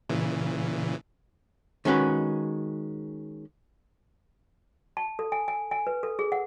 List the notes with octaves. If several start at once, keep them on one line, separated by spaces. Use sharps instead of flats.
A#2 C#3 E3
D#3 G#3 C#4 F#4 B4
A5
A4
G#5
G#5
G#5
B4
A4
G#4
F#5